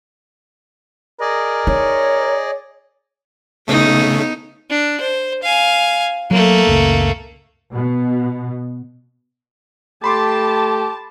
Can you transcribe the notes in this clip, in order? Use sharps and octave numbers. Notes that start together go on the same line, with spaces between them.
G#4 A#4 D5 D#5
D#4 C#5
C#3 A3 B3 D#4
D4
C5
F5 G#5
F#3 A3 A#3
F#1 C#2
B2
A3 G4 A5 B5 C6 D6